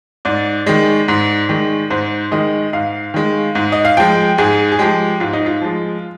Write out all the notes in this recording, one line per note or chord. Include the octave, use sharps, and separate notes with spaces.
G#2 D5
D#3 G#3
G#2
D#3 G#3
G#2 C5
D#3 G#3 D#5
G#2 F5
D#3 G#3
G#2
D#5
F5
F3 G#3 G5
G#2 G#4
G#4
F3 G#3 G4
G#2 F4
D#4
F4
F3 G#3